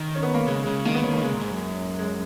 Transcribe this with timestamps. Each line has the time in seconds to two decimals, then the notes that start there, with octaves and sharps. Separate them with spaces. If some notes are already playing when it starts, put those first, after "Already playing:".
Already playing: D#3
0.15 C#4
0.23 B3
0.34 A#3
0.47 C#3 G#3
0.63 C#3 G#3
0.85 D#3 A#3
0.94 B3
1.03 D#3 C#4
1.13 A#3
1.18 D#3
1.22 C#3 G#3
1.32 A#2
1.42 G#2
1.51 F#2
1.99 G#3